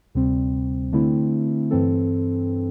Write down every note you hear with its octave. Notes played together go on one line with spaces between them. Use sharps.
D2 C3 G3 C4
D3 A3 C4 E4
G2 E3 C4 A4